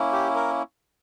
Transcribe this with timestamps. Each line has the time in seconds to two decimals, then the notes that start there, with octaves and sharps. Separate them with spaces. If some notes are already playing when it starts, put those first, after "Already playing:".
Already playing: A#3 C#4 E4
0.12 G4
0.35 A#4